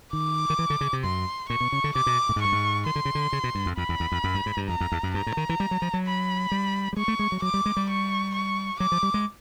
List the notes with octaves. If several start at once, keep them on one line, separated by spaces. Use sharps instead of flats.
D#3 D6
D#3
E3
D3
C#3
C3
F#2 C6
A#2 C#6
B2
C#3
D3
C3 D6
B2
A2
G#2
G2 C#6
G#2
D#3 C6
D3
C#3
D3
C#3
B2
G2
F2
F2 B5
E2
E2
F2
F#2
G2
G#2
G2
F2 A#5
F2
E2
F#2
G2 A#5
A2
D#3
E3
G3
F#3
F3
F#3
B5
G3
G3
G#3 C#6
A3
G#3
F#3
F#3 D6
G3
G#3
G3
C#6
C#6
F#3 D6
F3
G3
G#3